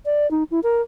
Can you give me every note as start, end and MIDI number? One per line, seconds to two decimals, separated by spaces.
0.05 0.29 74
0.31 0.43 63
0.51 0.60 64
0.63 0.81 70